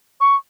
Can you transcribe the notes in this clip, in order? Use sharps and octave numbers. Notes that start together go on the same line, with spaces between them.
C#6